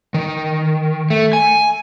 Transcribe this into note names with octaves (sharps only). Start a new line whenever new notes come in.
D#3
A3
G#5